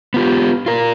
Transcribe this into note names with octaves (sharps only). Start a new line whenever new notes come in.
B3 F4 G4
F4 A#4